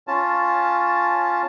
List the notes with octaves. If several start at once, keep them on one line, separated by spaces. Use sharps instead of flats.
C#4 F4 A5